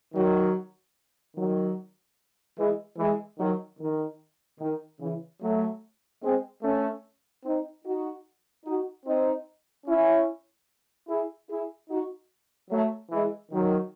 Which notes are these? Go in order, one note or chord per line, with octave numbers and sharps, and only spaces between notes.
D#3 F#3
D#3 F#3
E3 G#3
E3 G#3
D#3 F#3
D#3
D#3
C#3 E3
F#3 A3
G#3 C4
A3 C#4
C4 D#4
D#4 F#4
D#4 F#4
C4 D#4
C#4 E4
E4 G#4
E4 G#4
D#4 F#4
F#3 A3
E3 G#3
D#3 F#3